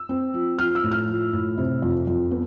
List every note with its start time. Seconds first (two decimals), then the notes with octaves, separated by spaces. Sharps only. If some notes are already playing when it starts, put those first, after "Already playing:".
Already playing: E6
0.09 C4
0.34 F3
0.59 F3 F6
0.75 E6
0.83 A2
0.91 F6
1.08 F3
1.33 A2
1.58 C3
1.82 F2
2.07 F2
2.31 B3